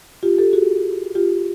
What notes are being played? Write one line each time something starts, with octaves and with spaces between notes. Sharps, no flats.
F4 G4
G4 A4
F#4 G#4
F4 G4